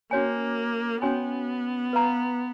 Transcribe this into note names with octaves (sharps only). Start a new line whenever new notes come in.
A#3 C#4 F#4 C#5 G#5
B3 C#4 F#4 C#5 G#5
B4 F5 A#5